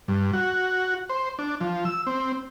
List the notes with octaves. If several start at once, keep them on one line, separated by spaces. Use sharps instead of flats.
G2
F#4
C5
D4
F3
E6
C4